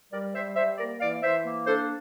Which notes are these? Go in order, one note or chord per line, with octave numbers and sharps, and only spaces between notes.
G3 A#4 D5
G3 C5 E5
G3 C5 E5
A#3 A#4 D5
E3 D5 F5
E3 C5 E5
A#3
D4 A4 C5